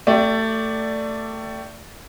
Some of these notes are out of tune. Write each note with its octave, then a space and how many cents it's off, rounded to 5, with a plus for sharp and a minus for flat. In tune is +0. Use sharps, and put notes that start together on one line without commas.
A3 +20 G4 -25 D5 +0